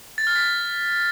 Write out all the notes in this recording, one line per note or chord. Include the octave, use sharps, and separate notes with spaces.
A6
F6
B6